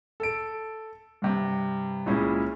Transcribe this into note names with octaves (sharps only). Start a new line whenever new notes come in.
A4 D7
G2 C3
C#2 A#2 C#4 E4 G#4